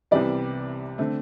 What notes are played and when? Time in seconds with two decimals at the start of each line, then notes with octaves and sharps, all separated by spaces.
0.11 C2 C3 E3 G3 B3 D5
0.98 D3 A3 C4